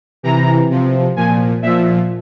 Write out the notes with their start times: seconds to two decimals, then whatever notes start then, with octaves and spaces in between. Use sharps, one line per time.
0.23 C3 E3 A#5
0.70 C3 F3
1.16 A#2 F3 G#5
1.62 A#2 F3 E5